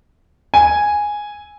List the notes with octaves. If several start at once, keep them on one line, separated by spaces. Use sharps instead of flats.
G#5